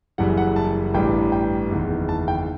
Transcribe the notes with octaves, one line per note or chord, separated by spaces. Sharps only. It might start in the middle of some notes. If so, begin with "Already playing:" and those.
F#1 F#2 E3 G3 F#5
F#5
A5
A1 G2 E3 G3 G5
G5
F#1 E2 D#3
A5
G5